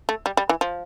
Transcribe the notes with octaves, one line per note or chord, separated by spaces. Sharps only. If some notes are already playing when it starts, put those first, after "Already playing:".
A3
G3
G3
E3
F3